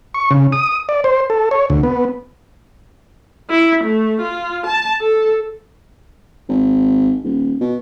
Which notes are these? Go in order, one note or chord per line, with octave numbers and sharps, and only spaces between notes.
C#6
C#3
D#6
D5
C5
A4
C#5
D2
B3
E4
A3
F4
A5
A4
G#1
D#1
B2